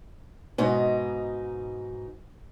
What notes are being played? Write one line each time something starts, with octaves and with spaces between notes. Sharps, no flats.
G#2 B2 D#4